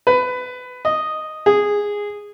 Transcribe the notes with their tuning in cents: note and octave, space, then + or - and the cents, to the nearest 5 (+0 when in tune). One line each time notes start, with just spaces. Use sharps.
B4 +20
D#5 -5
G#4 -10